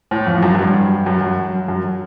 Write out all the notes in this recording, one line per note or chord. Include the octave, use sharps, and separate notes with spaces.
A2
F2
F#2
F#2
G2
F#2
F#2
F#2